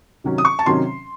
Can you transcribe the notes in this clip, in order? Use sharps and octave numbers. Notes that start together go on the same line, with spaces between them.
C3 D#3 F#3 C#4
D#6
C#6
A5
C3 D#3 F#3 C#4 C6